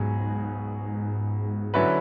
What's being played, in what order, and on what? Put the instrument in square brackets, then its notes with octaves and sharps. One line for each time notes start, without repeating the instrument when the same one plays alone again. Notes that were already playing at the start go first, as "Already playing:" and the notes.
Already playing: [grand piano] C#2 B2 F#3 G#4 [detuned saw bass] G#2
[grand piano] D3 F#3 C#4 E4 B4